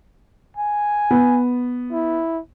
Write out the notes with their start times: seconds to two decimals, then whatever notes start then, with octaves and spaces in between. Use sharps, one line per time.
0.57 G#5
1.11 B3
1.92 E4